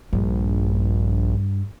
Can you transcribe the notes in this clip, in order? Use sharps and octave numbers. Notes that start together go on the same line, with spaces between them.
A#1 G2